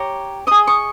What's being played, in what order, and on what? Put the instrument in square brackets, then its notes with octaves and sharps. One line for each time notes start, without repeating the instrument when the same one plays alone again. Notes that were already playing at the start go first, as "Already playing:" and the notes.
Already playing: [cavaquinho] G4 C#5 A#5
G#4 D#5 D#6
C#6